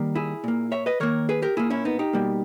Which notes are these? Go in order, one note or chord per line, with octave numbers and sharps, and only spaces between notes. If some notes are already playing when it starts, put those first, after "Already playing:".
Already playing: D#3 G3 A#3
E4 G#4
A#2 A#3
C#5 E5
B4 D#5
D#3 A#3 A#4 C#5
G#4 B4
G4 A#4
A#2 A#3 E4 G#4
C#4 E4
B3 D#4
D#4 G4
B2 G3 A#3